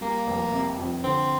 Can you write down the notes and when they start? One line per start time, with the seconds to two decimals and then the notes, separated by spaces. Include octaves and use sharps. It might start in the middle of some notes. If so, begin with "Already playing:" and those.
0.01 G3 A#3
0.27 F1
0.52 C3
0.78 F2
1.04 D3 C4